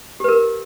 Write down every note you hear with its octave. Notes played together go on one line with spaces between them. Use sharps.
G4 A#4 B4